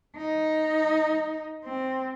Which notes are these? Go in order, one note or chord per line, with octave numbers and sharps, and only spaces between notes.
D#4
C4